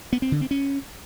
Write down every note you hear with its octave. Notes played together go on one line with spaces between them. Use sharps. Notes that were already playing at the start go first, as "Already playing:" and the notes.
B3
C4
D3
C4
C#4